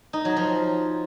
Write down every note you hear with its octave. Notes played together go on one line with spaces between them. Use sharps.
D#4
F#3
F3